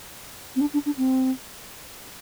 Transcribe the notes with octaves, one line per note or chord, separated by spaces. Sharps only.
C4
D4
D4
D4
C4